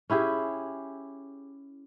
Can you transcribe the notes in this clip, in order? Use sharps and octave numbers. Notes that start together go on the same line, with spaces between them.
C#4 E4 G4 G#4